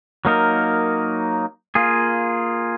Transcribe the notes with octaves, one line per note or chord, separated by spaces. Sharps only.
F#3 A#3 D#4 A#4
A#3 F4 G#4